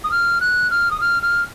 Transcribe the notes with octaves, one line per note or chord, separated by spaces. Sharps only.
D#6
F6
F#6
F6
D#6
F6
F6